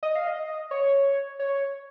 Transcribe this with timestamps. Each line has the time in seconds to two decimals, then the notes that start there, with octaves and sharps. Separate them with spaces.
0.03 D#5
0.16 F5
0.27 D#5
0.71 C#5
1.39 C#5